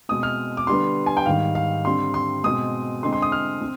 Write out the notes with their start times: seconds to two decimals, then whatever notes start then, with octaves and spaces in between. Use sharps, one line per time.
0.09 B2 G#3 C4 D#6
0.23 F6
0.57 D6
0.67 D3 G3 B3 C6
1.06 G#5
1.17 G5
1.26 G#2 D#3 G3 F5
1.55 F5
1.85 D3 G3 C4 C6
2.14 C6
2.44 B2 G#3 C4 D#6
3.02 D3 G#3 C4 C6
3.13 C6
3.22 D#6
3.32 F6
3.61 C4